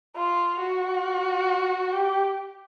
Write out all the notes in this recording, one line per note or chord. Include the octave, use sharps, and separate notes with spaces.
F4
F#4
G4